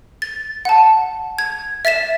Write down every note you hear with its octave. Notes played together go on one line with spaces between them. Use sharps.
A6
F#5 A5
G#6
E5 A6 B6 E7